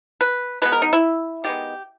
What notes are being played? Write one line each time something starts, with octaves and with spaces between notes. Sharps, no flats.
B4
B2 G#3 B3 B4
A#4
D#4
E4
D#3 G#3 B3 G4